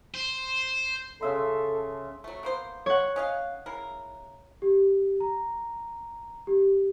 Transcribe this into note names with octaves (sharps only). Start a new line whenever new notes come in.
C5
C#3 A4 E5 C6
F#3 A3
A#3 B3 C5
C#5 F#5
C#4 D#5 F5
C#3 E4 A#4
G4
A#5
G4